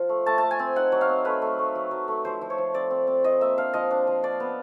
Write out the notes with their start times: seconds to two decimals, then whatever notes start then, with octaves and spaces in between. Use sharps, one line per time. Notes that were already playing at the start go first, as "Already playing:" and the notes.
Already playing: F3 F4
0.09 A3
0.26 A3 A5
0.38 A3 A5
0.51 G#5
0.59 C4
0.76 D#4 F#5
0.92 F#3
1.01 F5
1.09 C4
1.25 A3 B4
1.42 A3
1.59 A3
1.75 F#3
1.91 F#3
2.08 A3
2.25 F3 C5
2.41 F3
2.50 C#5
2.58 F3
2.74 C4 D5
2.91 C4
3.07 C4
3.24 F4 D#5
3.41 A#3 E5
3.58 D4 F5
3.74 F3 D#5
3.91 D4
4.07 F3
4.23 D4 D5
4.40 B3